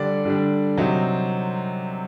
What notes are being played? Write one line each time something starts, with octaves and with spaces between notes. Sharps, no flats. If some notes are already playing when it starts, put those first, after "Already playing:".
Already playing: D3 G3 D4 D5
D3 G3 D4
C3 F#3 C4 D#4